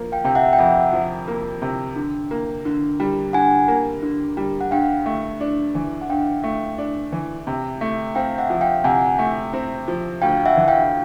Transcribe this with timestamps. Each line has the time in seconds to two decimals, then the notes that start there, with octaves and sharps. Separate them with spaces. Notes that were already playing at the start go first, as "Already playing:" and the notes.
Already playing: F3 A#3
0.12 F5 G5
0.24 C3 G5
0.35 E5 F#5
0.53 G5
0.59 F2 E5 F#5
0.93 F3
1.28 A#3
1.62 C3
1.96 D3
2.31 A#3
2.65 D3
3.00 G3
3.33 D3 F#5 G#5
3.68 A#3
4.03 D3
4.37 G3
4.61 F#5
4.71 G2 F5 G5
5.06 A3
5.40 D4
5.75 E3
6.02 F#5
6.10 G2 F5 G5
6.44 A3
6.78 D4
7.12 E3
7.47 C3
7.81 A3
8.15 C4 F5 G5
8.38 E5 F#5
8.50 F3
8.61 F5 G5
8.84 C3 F#5 G#5
9.19 A3
9.53 C4
9.88 F3
10.22 D2 F5 G5
10.46 E5 F#5
10.57 E3
10.68 F5 G5